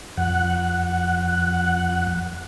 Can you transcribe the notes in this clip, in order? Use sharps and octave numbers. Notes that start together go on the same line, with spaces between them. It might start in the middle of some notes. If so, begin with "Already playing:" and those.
F2 F#5